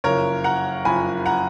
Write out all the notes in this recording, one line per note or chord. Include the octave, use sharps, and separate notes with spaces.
F#1 F2 C#3 A#4 C#5
F#5 A#5
F#1 F2 C#3 G#5 B5
F#5 A#5